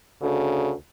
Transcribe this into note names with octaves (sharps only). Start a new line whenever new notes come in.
D2 C#3